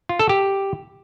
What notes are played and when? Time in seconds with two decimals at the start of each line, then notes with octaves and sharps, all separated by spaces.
0.09 F4
0.19 A4
0.29 G4